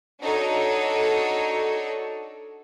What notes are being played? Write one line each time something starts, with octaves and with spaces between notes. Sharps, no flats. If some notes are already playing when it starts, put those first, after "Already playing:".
D4 D#4 F#4 A4 C#5